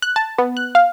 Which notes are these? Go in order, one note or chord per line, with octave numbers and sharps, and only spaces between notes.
F#6
A5
B3
F#6
F5